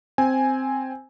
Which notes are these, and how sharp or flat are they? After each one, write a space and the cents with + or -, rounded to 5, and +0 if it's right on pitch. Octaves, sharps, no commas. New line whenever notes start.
C4 +0 G#5 +0